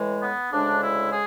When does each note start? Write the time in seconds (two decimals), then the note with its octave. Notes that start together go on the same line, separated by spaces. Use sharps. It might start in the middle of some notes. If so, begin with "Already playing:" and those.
Already playing: A2 E3 G#3
0.21 B3
0.51 D2 C#3 G#3 D4
0.81 E4
1.11 G#4